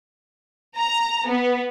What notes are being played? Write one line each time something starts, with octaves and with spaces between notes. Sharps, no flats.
A#5
B3